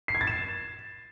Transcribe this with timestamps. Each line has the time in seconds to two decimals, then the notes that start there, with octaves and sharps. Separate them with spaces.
0.08 C7
0.15 G#6
0.21 A6
0.27 E7